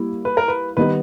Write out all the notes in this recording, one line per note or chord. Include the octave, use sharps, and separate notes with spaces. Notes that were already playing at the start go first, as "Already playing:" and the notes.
Already playing: G3 A#3 E4
B4
A#4
B4
D#3 G3 B3 D#4 B4